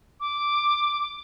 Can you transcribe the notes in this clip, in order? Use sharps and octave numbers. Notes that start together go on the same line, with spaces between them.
D6